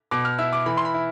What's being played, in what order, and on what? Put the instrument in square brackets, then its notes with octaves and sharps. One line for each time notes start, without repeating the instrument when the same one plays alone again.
[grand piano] B2 [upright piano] D6
[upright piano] F6
[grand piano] E4 [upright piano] E6
[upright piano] D6
[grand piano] E3 [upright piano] B5
[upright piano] C6
B5
[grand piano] E4